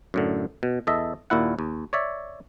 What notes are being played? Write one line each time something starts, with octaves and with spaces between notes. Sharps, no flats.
F#2 A2 D3
B2
E2 A4 D#5 E5
D#2 A#2 E4 F#5
D#2
C#5 D5 E5